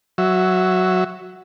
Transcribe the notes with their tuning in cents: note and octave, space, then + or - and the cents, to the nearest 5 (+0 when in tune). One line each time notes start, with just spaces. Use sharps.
F#3 +0 E5 +0